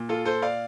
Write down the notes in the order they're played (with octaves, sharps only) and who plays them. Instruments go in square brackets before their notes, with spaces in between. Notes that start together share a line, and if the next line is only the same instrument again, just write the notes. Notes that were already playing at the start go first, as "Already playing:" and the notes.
Already playing: [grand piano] A#2
F4 A4
A4 C5
D5 F5